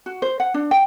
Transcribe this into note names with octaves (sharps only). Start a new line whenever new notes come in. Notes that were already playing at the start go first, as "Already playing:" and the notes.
F#4
C5
F#5
D4
G5